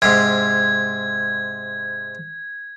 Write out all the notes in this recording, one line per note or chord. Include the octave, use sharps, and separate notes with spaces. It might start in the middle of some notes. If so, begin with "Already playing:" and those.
G#2 C3 G#6